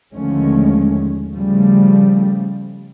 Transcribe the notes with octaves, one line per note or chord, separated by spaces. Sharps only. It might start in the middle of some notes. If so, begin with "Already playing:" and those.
D#2 D3 F3 G#3 A3 C#4
C#3 F3 G3 A3